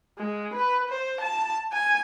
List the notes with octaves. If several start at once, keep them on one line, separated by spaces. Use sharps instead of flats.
G#3
B4
C5
A5
G#5